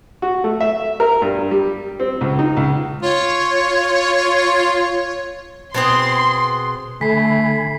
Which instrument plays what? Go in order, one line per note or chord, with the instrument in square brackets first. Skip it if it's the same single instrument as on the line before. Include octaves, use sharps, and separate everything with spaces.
[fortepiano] F#4
A3
E5
A#4
G2
G3
C4
C#2
D#4
C#2
[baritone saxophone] F4 [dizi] C#5
[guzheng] B2 C4 G#4 [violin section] C6
[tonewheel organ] D3 G#5 B5 [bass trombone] A3 [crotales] B6 C7